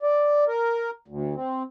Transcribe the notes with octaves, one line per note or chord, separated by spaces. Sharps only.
D5
A#4
D2
C4